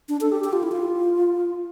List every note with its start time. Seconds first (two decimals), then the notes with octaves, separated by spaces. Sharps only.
0.09 D4
0.21 A4
0.32 G4
0.44 G4
0.53 F4
0.63 E4
0.72 F4